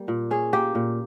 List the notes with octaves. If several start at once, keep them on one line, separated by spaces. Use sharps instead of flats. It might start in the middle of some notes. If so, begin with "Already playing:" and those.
Already playing: G3 A#3
A#2
C#4 G#4
A#3 G4
A#2